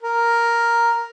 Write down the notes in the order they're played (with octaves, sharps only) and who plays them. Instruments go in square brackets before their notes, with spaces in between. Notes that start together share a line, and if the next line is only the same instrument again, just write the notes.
[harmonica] A#4